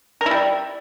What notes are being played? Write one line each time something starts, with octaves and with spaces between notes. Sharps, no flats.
A#4
E4
G3